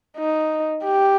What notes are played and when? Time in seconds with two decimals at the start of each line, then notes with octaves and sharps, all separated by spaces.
0.17 D#4
0.84 G4